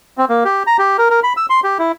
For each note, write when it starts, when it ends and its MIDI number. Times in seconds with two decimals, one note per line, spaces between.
0.18 0.25 60
0.29 0.44 58
0.45 0.63 67
0.67 0.77 82
0.79 0.97 67
0.98 1.08 70
1.10 1.20 70
1.23 1.33 83
1.37 1.46 88
1.50 1.60 84
1.64 1.78 67
1.79 1.92 64